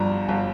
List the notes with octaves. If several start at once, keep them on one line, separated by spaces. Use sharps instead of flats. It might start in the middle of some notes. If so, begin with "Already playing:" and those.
Already playing: G1 G2 F3 A#5
G1